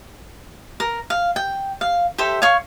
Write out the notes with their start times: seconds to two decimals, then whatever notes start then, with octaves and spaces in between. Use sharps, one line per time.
0.80 A#4
1.10 F5
1.36 G5
1.81 F5
2.18 G4 A4 C5 E5
2.42 C#5 F5 C#6